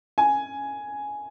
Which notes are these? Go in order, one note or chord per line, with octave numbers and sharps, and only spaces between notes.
G#5